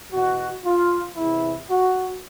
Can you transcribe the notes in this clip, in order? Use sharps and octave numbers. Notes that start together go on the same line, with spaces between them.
E2 B2 F#4
F4
E2 C3 E3 E4
F#4